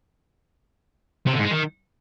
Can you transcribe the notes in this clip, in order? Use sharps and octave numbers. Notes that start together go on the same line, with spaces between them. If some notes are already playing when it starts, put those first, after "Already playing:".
C3
D3
G#2
G#3
D#3